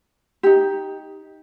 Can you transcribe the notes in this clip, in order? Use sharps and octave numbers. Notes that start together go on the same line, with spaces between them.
D#4 G4